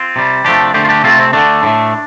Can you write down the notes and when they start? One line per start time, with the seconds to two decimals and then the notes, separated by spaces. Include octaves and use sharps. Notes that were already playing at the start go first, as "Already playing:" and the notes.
Already playing: C4 F4
0.16 C3 G3
0.45 C3 F3 A3 D4 G4
0.74 D3 A3 G4 C5
0.85 F4
0.89 D4 G4
1.04 C3 A3 C4 F4
1.19 C4
1.33 D3 A3 D4
1.63 A2 A3